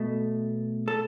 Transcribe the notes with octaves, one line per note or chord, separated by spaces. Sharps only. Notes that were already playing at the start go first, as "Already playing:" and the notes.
Already playing: B2 A3
A4